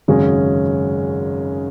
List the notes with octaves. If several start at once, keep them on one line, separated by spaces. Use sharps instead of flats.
G#1 F#2 C#3 G#3 C#4